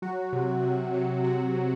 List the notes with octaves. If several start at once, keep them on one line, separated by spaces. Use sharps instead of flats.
F#3 F#4
C3
C3
F#3
C3 F#4
F#3